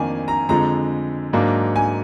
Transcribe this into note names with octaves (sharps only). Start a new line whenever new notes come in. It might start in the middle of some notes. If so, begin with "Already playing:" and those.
Already playing: F2 D#3 A#3 D4 G#5
A#5
F2 D3 F3 G#3 A#5
G#2 F#3 A#3 D4
G#5